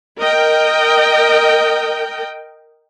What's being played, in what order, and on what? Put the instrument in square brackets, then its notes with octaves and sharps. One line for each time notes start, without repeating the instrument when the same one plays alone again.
[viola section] A#4 D#5 G5